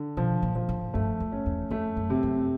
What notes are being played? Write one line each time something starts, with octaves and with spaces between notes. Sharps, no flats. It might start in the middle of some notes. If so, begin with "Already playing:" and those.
Already playing: D3
B2 F3
A#2
F3
A2
G2 A3
F2
C#4
E2
F2 A3
F#2
C3
F#2